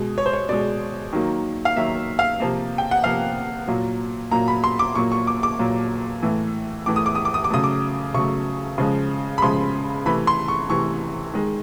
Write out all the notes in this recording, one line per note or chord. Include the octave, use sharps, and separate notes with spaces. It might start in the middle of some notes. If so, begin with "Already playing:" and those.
Already playing: B2 G#3
C#5
C5
C#5
B2 G#3 D5
D#3 F#3 A#3
F5
D#3 F#3 A#3 E5
F5
C3 F3 A#3
G5
F#5
C3 F3 A#3 F5
A#2 F#3 A#3
A#2 F#3 A#3 A#5
B5
C6
D6
A#2 F#3 A#3 C#6
C#6
D6
D6
A#2 F#3 A#3
A2 E3 A3
A2 E3 A3 D6
D#6
D6
D#6
D6
D#6
D6
C#3 F#3 A3 D#6
D6
C#3 F#3 A3 C#6
C#3 F3 G#3
B5
C#3 F3 G#3 C6
C3 E3 A3 B5
C6
C#6
C3 E3 A3 C#6
D#3 G#3